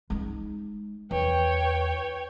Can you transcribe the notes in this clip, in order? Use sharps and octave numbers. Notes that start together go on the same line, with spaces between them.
G#3 D#4
E2 B4 C#5 G5